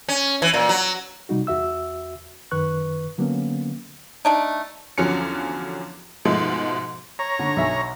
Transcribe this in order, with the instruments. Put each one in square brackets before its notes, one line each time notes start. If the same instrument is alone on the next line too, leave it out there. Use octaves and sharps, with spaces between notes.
[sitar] C#4
E3
A#2
F#3
[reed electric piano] C3 G3 D#4 F#4
E2 F#4 E5 E6
F#2 D#3 B4 C#6 F#6
D3 F#3 A#3 B3 C#4
[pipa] A3 D4 D#4
[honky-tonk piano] E2 D3 F3 F#3 C#4 C#7
G#2 B2 F3 G#3 A3
[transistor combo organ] C#5 A#5
[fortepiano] D3
B1 E5 G#5